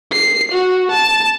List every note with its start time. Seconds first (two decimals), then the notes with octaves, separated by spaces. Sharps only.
0.12 C7
0.52 F#4
0.91 A5